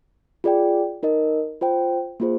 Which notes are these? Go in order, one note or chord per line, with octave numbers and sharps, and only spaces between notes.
F4 G#4 D5 G5
D#4 A#4 D#5
F4 C5 G5
A#3 F4 G#4 C5